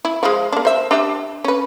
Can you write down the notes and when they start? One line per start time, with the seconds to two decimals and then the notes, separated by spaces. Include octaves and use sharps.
0.05 E4
0.23 F3 G#3
0.52 A#3 D4
0.65 C5 E5
0.91 D4 G4 E5
1.44 C#4 B4